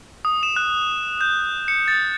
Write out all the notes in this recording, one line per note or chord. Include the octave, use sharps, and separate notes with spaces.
D#6
E7
F#6
G6
C#7
A6